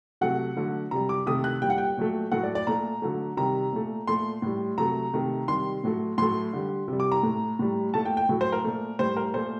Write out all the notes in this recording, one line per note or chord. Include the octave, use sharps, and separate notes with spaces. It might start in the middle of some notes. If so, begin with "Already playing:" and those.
C3 F#3 A3 F#5
D3 F#3 A3
C3 G3 A#5
D6
C3 D#3 A3 D#6
F#6
A#2 G3 G5
F#5
G5
A#2 F#3 A3
A2 F#3 A3 F#5
D5
D5
A#2 A3 A#5
D3 F#3 A3
C3 D#3 G3 A#5
A#2 A3
A#2 A3 C6
A2 G3
C3 F#3 A3 A#5
C3 D#3 A3
C3 D#3 G3 C6
A2 F#3 A3
A2 F#3 A3 C6
D3 G3
C3 G3
D6
A#5
A2 A3
A2 G3
A#2 A3 A5
G5
G5
A2 F#3 A3
C5
A#4
A#2 A3
A2 G3 C5
A#4
A#2 A3 C5